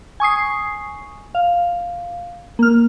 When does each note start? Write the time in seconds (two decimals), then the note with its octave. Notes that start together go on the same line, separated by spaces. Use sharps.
0.20 G#5 C#6 D#6 C7
1.35 F5
2.59 A#3 F6